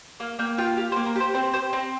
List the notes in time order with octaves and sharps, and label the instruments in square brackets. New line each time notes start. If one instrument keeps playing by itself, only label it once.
[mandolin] A#3 F5
A#3 G5
F4 G5
G4 F5
C5
A#3
A#4
G4 C5
C4 C5
G4 C5
C4 A#5